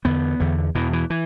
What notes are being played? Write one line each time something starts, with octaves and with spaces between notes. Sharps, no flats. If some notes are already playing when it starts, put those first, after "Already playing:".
E2 D3 B3
E2 D3
E2 B2 E3
E3
E3